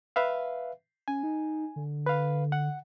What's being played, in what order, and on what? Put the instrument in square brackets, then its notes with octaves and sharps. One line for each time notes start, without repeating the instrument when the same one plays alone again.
[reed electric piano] B4 E5 F5
[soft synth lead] C#4 [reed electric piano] G#5
[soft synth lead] D#4
D3
[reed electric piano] B4 F5
F#5